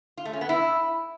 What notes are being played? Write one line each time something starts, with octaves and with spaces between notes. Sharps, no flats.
F4
A3
C#4
B3
E4